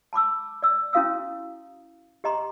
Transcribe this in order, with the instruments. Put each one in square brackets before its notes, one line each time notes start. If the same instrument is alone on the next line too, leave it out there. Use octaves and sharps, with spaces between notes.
[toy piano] A5 B5 D6 E6
D5 E6
C#4 E4 F#4 F5 D#6 E6
G4 D#5 A#5 C6 D6